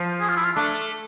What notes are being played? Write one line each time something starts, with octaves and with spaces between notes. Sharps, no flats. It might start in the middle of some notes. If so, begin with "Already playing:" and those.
Already playing: F3
G#4
F4
E4
F4
A3 D4